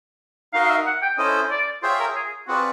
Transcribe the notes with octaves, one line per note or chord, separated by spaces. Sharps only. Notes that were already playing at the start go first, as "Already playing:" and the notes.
D#4 F#4 A#4 D#5 F5
F5
E5
F#5
G5
C#4 E4 A4 C5 D#5
D5
F4 G#4 C5 C#5 E5 G5
A#4
G#4
C4 F4 F#4 G#4 B4 D5